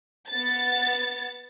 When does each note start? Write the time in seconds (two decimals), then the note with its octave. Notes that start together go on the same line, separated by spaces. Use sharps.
0.29 B3 A6